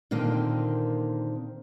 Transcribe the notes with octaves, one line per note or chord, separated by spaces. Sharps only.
A#2 D3 D#3 A#3 C4